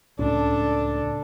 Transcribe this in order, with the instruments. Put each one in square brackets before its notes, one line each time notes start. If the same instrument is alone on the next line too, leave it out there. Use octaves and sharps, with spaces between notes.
[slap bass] C#2 A2 C#4 [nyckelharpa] D4 A4